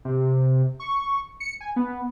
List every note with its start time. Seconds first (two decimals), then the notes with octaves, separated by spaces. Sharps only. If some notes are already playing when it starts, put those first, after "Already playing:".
0.05 C3
0.80 C#6
1.40 C#7
1.61 G#5
1.76 B3